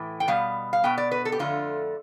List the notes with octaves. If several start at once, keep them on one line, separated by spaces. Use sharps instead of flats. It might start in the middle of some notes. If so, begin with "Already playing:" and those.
Already playing: A2 E3
G5
B2 G3 B3 F5
F5
B2 B3 G5
D5
B4
A4
G4
F2 D3 A3 F4